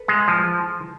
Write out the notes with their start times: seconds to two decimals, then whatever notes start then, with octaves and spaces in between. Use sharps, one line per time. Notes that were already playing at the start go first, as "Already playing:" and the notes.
Already playing: A4 B4
0.08 G#3
0.28 F3